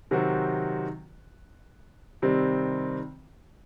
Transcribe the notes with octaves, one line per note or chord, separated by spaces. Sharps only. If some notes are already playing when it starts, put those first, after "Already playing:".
C3 D#3 F#3 C4 F#4
C3 D#3 G3 C4